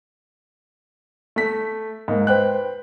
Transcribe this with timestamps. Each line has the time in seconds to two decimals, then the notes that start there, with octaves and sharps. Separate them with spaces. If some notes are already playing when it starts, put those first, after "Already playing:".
1.36 A3 B6
2.08 G#2 A#3
2.27 B4 C5 G5 F#6